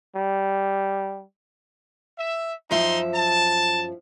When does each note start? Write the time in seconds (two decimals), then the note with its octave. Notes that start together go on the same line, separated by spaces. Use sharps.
0.16 G3
2.19 E5
2.71 F#2 F3 D#4 E5 C6
3.14 A5